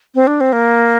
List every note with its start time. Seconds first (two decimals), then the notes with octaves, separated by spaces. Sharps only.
0.15 C4
0.27 D4
0.41 C4
0.53 A#3